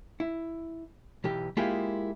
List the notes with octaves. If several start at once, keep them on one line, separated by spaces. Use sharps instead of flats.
E4
B1 E3 G4
G#3 A#3 E4 F4 G4 G#4